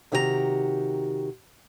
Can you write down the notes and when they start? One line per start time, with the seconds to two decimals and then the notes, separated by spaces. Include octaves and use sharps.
0.12 C3 D#3 F#4 G4 A#4 A#5